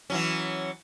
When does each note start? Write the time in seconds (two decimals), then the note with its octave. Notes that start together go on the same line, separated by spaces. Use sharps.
0.10 E3 F#3 C#4